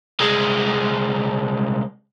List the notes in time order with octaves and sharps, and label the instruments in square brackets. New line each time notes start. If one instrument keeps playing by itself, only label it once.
[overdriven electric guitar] C2 G#3